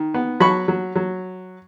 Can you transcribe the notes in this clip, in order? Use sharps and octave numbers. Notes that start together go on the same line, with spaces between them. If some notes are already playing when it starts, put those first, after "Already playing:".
Already playing: D#3
B3
F#3 B5 C#6
F#3
F#3